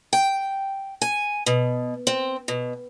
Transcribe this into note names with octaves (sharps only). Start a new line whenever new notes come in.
G5
G#5
B2
C4
B2